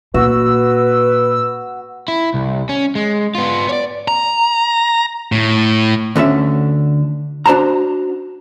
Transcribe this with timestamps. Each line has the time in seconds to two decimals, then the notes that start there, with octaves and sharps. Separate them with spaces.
0.14 A#2 F#4 B4 E6
2.08 E4
2.34 C2
2.69 C#4
2.95 G#3
3.35 B3 F4
3.69 C#5 D5
4.08 A#5
5.32 A2
6.16 D2 D3 C#4 E5
7.46 D4 F#4 C5 A5 A#5